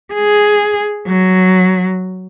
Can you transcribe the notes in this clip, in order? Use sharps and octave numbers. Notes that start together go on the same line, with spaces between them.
G#4
F#3